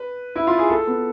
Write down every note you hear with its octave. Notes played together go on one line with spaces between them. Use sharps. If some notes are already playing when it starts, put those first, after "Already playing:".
Already playing: B4
E4
F4
G#4
A4
B3